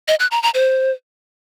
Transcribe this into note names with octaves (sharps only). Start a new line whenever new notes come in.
D#5
F#6
A#5
A#5
C5